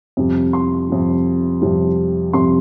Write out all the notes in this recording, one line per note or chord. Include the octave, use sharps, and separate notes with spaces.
F2 C3 G3
C6
F2 C3 G3
F2 C3 G3
F2 C3 G3 C6